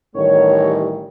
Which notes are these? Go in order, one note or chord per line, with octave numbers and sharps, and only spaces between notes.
A1 D#3 G3 C#5